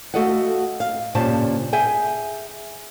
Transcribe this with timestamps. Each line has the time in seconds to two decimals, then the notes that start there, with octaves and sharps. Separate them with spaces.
0.14 A3 F#4 A4 D#5 F5 F#5
0.80 F5
1.15 G2 A#2 C#3 G3 C5 A5
1.73 G#4 E5 G5 G#5